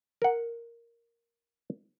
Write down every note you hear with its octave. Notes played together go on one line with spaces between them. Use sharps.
A#4 F#5